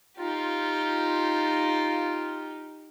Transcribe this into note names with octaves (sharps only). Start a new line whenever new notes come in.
D#4 F4 G4